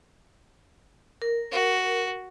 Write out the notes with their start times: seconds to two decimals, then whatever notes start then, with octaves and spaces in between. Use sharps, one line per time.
1.22 A#4
1.52 F#4